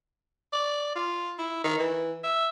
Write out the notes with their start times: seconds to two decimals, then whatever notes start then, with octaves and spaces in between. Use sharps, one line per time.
0.53 D5
0.96 F4
1.39 E4
1.64 D#3
1.79 E3
2.24 E5